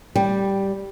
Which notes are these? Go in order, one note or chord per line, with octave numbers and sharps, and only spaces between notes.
G3